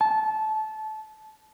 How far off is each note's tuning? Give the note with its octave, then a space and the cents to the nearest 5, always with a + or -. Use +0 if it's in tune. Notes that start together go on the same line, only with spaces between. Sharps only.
A5 -20